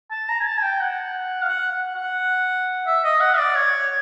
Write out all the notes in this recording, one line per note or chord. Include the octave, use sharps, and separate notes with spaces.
A5
A#5
G#5
A5
G#5
G5
F#5
F5
F#5
F#5
E5
D#5
F#5
D5
C#5